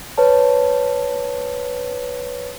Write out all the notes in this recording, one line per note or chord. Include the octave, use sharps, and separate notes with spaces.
B4 C#5 A5